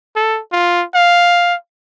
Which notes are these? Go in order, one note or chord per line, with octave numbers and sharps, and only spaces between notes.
A4
F4
F5